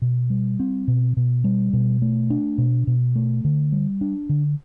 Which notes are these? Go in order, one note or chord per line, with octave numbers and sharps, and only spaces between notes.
B2
G3
C4
B2
B2
G3
B2
A3
D4
B2
B2
A3
D3
G3
D4
D3